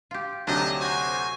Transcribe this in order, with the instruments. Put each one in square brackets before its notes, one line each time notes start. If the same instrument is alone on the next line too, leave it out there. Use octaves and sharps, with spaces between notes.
[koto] F4 G4
[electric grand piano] D2 C3 F#3 [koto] D4 [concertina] D#4 [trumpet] D#5
[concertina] F#4 C5 [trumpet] G#5